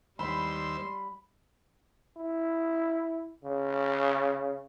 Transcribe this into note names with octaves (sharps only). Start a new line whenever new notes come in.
D#2 G3 C5 B5 C6 E6
E4
C#3